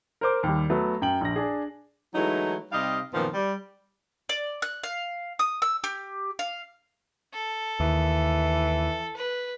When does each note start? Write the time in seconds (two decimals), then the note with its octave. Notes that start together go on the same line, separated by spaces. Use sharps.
0.21 A#4 C5 D6
0.43 D#2 G3
0.70 F#3 A3 B3
1.02 F#2 G5 F#7
1.21 A#1 A#6
1.36 D4 G#4
2.15 E3 F#3 G#3 A3 D#4 E4
2.72 C3 G3 D#4 D#5 F5
3.13 F#2 A#2 D#3 F3 B3
3.34 G3
4.29 D5
4.62 F#6
4.84 F5
5.39 D#6
5.62 E6
5.84 G4
6.39 F5
7.33 A4
7.80 D#2 E3
9.17 B4